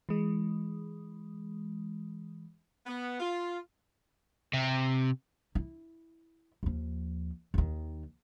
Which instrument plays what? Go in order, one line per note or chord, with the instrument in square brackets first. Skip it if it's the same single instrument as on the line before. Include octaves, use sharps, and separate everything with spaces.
[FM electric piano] E3 G#3
[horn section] B3
F4
[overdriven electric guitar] C3
[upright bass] E4
D#2 F3
D#2 D#3